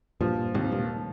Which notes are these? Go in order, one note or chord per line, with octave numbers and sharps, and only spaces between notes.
G2 A#2 F3
D#2 G#2 C3
G2 A#2